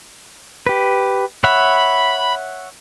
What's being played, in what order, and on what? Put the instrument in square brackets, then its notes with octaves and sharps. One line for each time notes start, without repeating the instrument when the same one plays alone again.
[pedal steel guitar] G4 B4
[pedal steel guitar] C#5 E5 F#5 [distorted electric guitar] B5